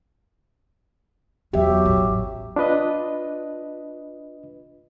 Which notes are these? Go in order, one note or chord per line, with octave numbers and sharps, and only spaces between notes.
E2 F#3 G4 E5
A1
D4 F4 B4 D#5